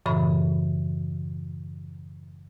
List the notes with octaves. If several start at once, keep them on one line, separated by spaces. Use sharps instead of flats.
F#2 A2 C#3 E3 B5